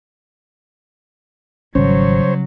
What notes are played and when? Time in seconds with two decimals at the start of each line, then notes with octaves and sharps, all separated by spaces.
1.75 G#1 C#3 F#3 G3 C#4 C5 C#5